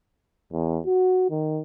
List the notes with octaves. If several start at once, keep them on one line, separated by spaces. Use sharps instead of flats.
E2
F#4
D#3